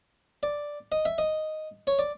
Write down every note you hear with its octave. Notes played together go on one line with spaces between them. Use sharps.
D5
D#5
E5
D#5
C#5
D5